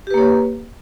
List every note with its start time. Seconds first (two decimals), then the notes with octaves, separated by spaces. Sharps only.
0.07 G4
0.10 B4
0.14 A#3
0.18 C#5